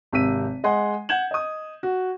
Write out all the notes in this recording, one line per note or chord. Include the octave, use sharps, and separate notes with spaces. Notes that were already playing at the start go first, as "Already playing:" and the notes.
G#1 C3 E6 B6 D#7
G#3 D#5 F#5 G#5 C6
F#5 G6 G#6 E7 F#7
D#5 D#6
F#4